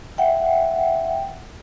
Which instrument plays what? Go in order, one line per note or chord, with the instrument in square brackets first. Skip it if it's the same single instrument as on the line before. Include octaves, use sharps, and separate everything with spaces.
[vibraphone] E5 F#5 G5